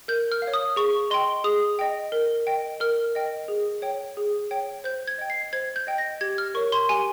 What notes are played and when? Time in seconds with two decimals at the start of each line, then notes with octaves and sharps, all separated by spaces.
0.08 A#4 G6
0.32 F6
0.42 F5
0.47 C#5
0.54 D#6
0.76 G#4 C#6
1.10 D#5 G5 C6
1.44 G#4 D#6
1.79 D#5 G5
2.12 A#4
2.47 D#5 G5
2.80 A#4 F6
3.15 D#5 G5
3.48 G#4
3.82 C#5 G5
4.17 G#4
4.51 C#5 G5
4.84 C5 G6
5.08 G#6
5.18 D#5 G5
5.30 C7
5.53 C5 G#6
5.76 G6
5.87 D#5 G5
5.98 A#6
6.21 G4 G#6
6.38 F6
6.54 A#4 C#5 C#6
6.72 C6
6.89 G4 G#5